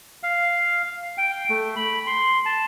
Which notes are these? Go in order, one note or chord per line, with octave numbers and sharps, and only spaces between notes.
F5
G5
A3
B5
C6
A5